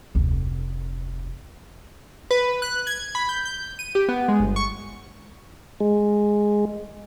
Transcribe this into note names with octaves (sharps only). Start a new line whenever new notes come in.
F1 D2
B4
F#6
G#6
B5
G6
G6
D#7
G4
B3
G#3
G1
C#6
G#3